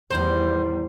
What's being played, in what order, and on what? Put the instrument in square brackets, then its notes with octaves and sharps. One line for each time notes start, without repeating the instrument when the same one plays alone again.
[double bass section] E2 G3 [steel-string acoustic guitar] A2 D#3 [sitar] C5